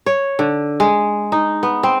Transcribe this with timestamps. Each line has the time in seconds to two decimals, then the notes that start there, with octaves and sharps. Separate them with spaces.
0.06 C#5
0.39 D3
0.80 G#3
1.32 D#4
1.63 B3
1.83 C4